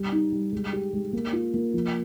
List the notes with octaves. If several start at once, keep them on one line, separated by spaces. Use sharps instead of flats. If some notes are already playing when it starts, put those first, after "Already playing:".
Already playing: G3
D#4
G3
G#3
G4
G#3
A#3
F4
A#3
F3